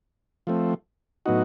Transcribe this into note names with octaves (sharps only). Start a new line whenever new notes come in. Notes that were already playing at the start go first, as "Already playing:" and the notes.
F3 A3 C4
A2 F#3 B3 D#4 F#4